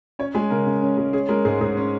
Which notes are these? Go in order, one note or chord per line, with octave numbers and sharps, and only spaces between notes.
C#4 C#5
G#3 G#5
C#3 A#4
C#3
C#4
G#3
C#4 G#4
G#3 A#4
G#2 G#4
G#2 G#4
C#4